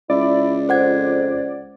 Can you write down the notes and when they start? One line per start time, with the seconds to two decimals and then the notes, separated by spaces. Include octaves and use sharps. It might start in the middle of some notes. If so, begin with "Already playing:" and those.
0.10 C#2 E4 D5
0.69 F2 C5 F#5 G#6